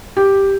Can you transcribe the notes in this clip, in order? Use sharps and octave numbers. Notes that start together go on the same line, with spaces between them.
G4